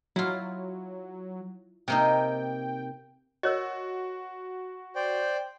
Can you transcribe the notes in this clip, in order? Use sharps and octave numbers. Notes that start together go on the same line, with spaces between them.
F#3 E4 F4
C3 A#3 D#4 G5
F#4 A#4 C#5 D#5
C5 D5 G5